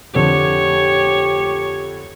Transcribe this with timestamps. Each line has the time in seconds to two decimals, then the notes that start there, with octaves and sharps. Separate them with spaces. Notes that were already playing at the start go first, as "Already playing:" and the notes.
0.15 F2 D3 G4 C#5